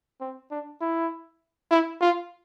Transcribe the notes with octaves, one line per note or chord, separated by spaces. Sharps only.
C4
D4
E4
E4
F4